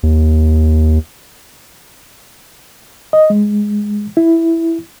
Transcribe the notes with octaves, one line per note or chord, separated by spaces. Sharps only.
D#2
D#5
G#3
E4